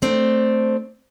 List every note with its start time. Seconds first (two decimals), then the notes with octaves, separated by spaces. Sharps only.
0.02 A3 C4 D4